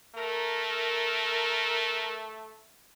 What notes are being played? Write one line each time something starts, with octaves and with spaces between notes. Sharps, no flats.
A3 A#4